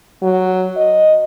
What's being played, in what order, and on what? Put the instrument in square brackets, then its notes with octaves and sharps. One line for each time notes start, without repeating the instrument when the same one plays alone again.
[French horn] F#3
D#5